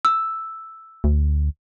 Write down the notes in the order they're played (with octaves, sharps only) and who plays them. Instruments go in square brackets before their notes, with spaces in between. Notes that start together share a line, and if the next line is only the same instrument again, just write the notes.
[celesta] E6
[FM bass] D2